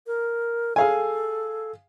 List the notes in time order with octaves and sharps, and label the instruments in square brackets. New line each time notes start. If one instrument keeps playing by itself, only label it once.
[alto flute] A#4
[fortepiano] G#4 F5 G#5 [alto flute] A4